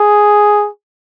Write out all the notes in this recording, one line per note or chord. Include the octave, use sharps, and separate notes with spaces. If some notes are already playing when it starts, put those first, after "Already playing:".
Already playing: G#4